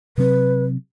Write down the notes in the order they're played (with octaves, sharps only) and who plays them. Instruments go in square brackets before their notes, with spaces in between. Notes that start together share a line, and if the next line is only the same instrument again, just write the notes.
[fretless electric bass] C3 F#3 C4 [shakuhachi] B4